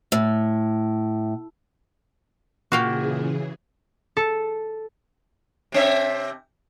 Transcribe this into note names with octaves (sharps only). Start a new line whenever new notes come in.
A2
A#2 C#3 E3 F#4 G#4 F5 G5
A4
C3 C4 E5